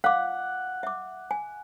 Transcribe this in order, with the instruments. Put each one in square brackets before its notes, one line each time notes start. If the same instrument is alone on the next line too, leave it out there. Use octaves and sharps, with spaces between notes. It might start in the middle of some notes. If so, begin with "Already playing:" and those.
[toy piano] F5 D6 [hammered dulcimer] F#5
[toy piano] E5 D6
G#5